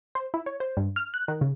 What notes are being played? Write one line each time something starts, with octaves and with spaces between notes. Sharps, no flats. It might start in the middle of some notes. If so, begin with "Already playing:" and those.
C5
E4
C#5
C5
G2
F6
F#6
D#3
C#3